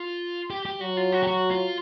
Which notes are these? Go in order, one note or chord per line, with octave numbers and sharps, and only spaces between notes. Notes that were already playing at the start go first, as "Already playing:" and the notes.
Already playing: F4
G4
G4
F#3 F#4
F4
F#4
G4
F#4
F4